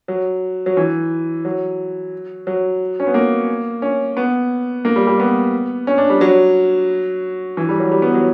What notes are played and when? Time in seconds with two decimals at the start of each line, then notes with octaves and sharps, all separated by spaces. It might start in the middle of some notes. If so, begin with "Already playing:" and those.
0.08 F#3
0.66 F#3
0.77 E3
1.45 F#3
2.47 F#3
3.00 C#4
3.07 B3
3.14 A#3
3.82 C#4
4.17 B3
4.85 A#3
4.96 G3
5.07 G3
5.19 B3
5.87 C#4
5.98 D4
6.10 G3
6.21 F#3
7.57 E3
7.69 G3
7.80 F#3
7.92 G3
8.02 B3
8.14 F#3